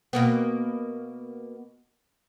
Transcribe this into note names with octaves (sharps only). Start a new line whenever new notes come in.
B2 A#3 B3